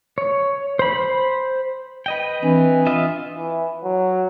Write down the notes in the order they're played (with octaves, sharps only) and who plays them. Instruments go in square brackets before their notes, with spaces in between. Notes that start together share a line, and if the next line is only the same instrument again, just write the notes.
[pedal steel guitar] C#5
C5 B5
B4 D#5 G5
[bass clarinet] E3 [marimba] C4 D4
[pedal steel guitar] F4 D#5 E5
[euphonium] E3
F#3